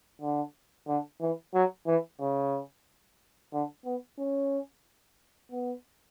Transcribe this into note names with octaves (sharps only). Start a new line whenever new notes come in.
D3
D3
E3
F#3
E3
C#3
D3
B3
C#4
B3